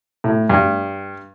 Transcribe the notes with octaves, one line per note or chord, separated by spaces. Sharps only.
A2
G2